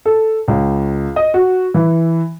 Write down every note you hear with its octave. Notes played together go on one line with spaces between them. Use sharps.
A4
C#2
D#5
F#4
E3